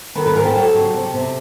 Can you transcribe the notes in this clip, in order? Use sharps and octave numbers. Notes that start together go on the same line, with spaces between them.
D#3 A4 B4
A4 B4
G#2 G#4 A#4
G4 A4
F#3 G4 A4
C#3
C3
C3